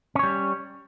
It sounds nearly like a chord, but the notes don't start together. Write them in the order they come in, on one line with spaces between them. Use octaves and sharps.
C#4 C#5 G3